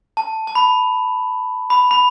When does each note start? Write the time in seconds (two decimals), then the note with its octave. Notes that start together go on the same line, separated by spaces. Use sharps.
0.17 A5
0.47 A5
0.55 B5
1.70 B5
1.91 B5